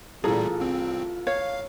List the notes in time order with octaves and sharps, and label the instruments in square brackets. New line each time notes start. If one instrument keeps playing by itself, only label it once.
[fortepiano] A1 A4 A#5 [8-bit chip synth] A#2 G3 [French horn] F4 [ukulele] G#4
[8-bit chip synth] C2 C4
[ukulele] C#5 [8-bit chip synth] F5